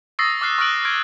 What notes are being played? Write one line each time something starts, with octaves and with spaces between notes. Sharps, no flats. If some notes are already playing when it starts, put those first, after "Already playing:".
C#6 D#6 E6 A6 A#6 C7
D6 F6 F#6 C7
C#6 F6 F#6 D7 F#7
C#6 F6 G#6 D7